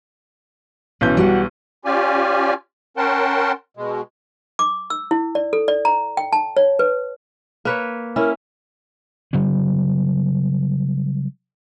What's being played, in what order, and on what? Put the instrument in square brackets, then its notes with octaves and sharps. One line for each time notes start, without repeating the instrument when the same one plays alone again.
[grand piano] B1 E3 G6 [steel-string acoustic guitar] C#4
[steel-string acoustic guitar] G3 F#4 F#5
[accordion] C#4 F4 G4 D5 G#5
C#4 A#4 F#5 G5 A5 C6
B2 G#3
[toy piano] D6
E6
E4
D5
A4
D5
A#5
G5
A5
C#5
B4
[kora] A#3 B4 C#5
[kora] C#4 E4 [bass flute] A#4
[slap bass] C#3 F#3 G3 B3